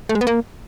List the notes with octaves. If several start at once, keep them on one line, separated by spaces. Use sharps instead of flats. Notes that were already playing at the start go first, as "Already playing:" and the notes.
A3
G#3
B3
A#3